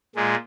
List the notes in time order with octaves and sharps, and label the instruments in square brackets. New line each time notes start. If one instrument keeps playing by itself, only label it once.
[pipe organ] A#2 G#3